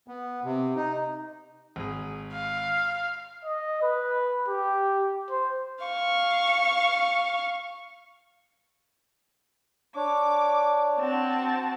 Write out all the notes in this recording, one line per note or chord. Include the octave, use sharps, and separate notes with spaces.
B3
C3
D#4
G#1 G#4
F5
D#5
B4
G4
C5
F5 C#6
D4 C#5 D6
C4 F#4 A5